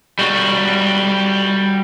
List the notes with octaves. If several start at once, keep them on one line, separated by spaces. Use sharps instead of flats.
G3 F#4